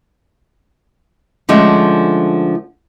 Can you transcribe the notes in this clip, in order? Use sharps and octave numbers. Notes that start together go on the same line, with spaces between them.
D3 F3 G#3 A3 C#4